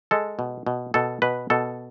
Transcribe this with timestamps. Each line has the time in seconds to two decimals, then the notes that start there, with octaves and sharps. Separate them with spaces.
0.11 G#3 A4
0.39 B2
0.67 B2
0.94 B2 A4
1.22 B2 B4
1.50 B2 A4